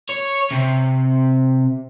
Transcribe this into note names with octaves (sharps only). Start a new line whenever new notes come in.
C#5
C3